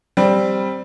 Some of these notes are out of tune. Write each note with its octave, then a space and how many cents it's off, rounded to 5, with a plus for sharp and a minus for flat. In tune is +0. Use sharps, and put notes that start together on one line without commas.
G3 +0 C4 +0